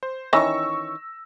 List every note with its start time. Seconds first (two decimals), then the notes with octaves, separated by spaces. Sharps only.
0.03 C5
0.33 D#3 E3 C#4 C#6 E6 A#6